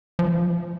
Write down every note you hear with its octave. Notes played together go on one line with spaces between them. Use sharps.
F3